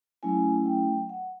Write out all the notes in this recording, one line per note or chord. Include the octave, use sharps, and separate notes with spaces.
F#3 A3 C#4 E4 G#5
G5
F#5